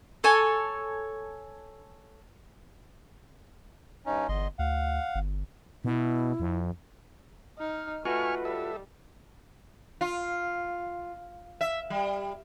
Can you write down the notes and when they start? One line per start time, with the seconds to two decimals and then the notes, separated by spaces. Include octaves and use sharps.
0.24 A4 C#5 G#5
4.06 G2 C#4 D#4
4.29 G1 E2 D#5 C6
4.59 D2 F5 F#5
5.15 G1
5.85 B2 E4
6.40 F2
7.59 D#4 F6
8.05 A3 F4 F#4 B4 G#5 C#6 F6
8.45 G3 A4 E5
10.01 F4
11.61 E5
11.90 G3